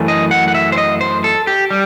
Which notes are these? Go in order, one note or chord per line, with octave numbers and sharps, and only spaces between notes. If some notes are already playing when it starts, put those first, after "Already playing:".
Already playing: F#2 E3 A3
D#5
F#5
F#5
E5
C5
D#5
C5
A4
G4
G3